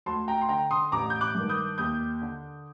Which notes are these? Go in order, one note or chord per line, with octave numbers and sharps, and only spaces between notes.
D2 A5 C6
G5 A#5
C6
D3 G5 A#5
C6 D#6
A1 A#5 D6
G6
D6 F#6
G2 D#3
D#6 G6
D#2 D#6 G6
D3